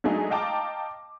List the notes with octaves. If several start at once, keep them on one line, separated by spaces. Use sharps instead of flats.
F#3 G#3 A3 D4 D#4 G#4
D#5 F5 G5 A5 A#5 D6